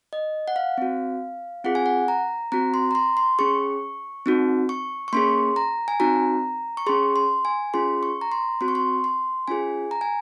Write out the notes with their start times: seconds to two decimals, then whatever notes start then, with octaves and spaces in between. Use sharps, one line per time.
0.13 D#5
0.48 F#5
0.56 F5
0.78 C4 F#4
1.64 C4 F4 G#4 F#5
1.75 G#5
1.86 F#5
2.08 A#5
2.52 C4 F#4 A#5
2.74 C6
2.91 A#5
2.95 C6
3.17 C6
3.39 C#4 G#4 C#6
4.26 C4 D#4 F#4
4.69 C#6
5.08 C#6
5.13 A#3 C#4 G#4 C6
5.56 A#5
5.88 G#5
6.00 C4 D#4 F#4 A#5
6.77 C#6
6.86 C#4 G#4 C6
7.16 C6
7.45 G#5
7.74 C#4 F4 G#4 C6
8.03 C#6
8.21 A#5
8.32 C6
8.61 C4 F#4 C6
8.68 C#6
8.75 C6
9.04 C6
9.48 C#4 F4 G#4 G#5
9.91 A#5
10.01 G#5